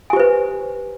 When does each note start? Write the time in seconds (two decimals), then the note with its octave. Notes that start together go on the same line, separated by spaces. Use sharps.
0.10 G#5
0.13 G4
0.16 C5
0.20 B4